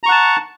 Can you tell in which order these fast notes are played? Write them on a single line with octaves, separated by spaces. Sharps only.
A#5 C#6 F#5 A5